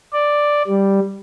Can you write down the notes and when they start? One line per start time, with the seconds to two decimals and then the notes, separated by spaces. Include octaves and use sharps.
0.13 D5
0.67 G3